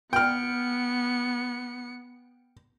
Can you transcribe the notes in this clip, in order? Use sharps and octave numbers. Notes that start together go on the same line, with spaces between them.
B3 G5 F6 C#7